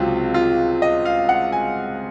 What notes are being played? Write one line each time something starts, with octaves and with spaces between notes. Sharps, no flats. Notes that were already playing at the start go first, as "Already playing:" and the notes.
Already playing: C#2 C3 F#3 C4 F4
F4
D#5
F5
F#5
G#5